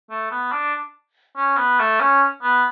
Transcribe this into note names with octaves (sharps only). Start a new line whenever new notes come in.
A3
B3
D4
C#4
B3
A3
C#4
B3